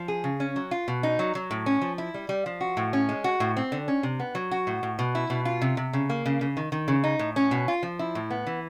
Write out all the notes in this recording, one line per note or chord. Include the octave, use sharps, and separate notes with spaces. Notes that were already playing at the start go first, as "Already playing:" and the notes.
Already playing: F3
G#4
C#3
C#4
F#3
F4
B2
D#4
F#3
F#3
A2
C#4
F3
E4
G3
G3
F3
F#4
A2
C#4
G#3
F#4
A2
C4
D3
C#4
C3
B3
F#3
F#4
A2
A2
B2
E4
B2
F4
C3
C3
C#3
A#3
C#3
C#3
D#3
D#3
C#3
D#4
A2
C#4
B2
F4
F3
E4
A2
B3
E3